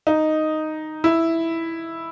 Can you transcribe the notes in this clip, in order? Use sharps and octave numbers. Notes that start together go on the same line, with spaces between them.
D#4
E4